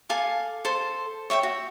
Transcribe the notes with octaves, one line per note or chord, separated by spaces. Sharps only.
A4 F5 G#5 D6
A4 C5
C#5 E5 F5 G5
F#4